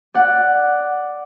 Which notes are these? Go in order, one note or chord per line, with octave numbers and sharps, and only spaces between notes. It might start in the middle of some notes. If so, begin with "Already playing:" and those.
D5 F#5